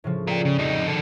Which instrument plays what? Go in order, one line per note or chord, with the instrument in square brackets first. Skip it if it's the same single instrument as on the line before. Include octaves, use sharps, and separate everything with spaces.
[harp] A2 C#3 F3
[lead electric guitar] F4 A#4 [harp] D5 G5
[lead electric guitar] C#3
[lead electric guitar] F2 D#4 [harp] F#4
[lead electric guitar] D#3 A4